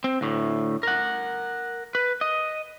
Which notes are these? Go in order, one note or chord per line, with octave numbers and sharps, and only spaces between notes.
C4
D2 A2
A#4 F#5
B4
D#5